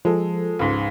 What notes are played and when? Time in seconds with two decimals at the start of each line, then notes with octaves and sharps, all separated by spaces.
0.05 F3 G#3 A4
0.59 C#2 G#2